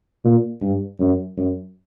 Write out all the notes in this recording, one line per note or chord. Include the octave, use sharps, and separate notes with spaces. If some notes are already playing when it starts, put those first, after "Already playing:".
A#2
G2
F#2
F#2